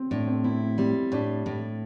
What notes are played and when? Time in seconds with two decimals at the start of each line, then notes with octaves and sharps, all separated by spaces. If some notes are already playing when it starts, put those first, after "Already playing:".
Already playing: C4
0.11 A2 D4
0.27 C4
0.44 C4 E4
0.78 G3 C4
1.12 A2 D4
1.46 A2